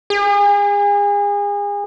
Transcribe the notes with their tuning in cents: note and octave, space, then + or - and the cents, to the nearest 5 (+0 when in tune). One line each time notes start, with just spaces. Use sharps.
G#4 -35